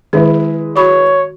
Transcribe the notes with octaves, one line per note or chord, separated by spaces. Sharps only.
D#3 G#3 E4 B4
F#4 C#5 B5